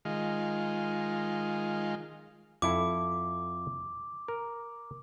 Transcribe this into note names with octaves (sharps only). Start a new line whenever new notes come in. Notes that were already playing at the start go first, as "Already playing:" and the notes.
D#3 G#3 F4
F2 E4 A4 D6
A#4